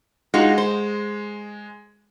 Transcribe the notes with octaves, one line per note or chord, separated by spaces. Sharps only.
G#3 D#4 F4 F#4
C5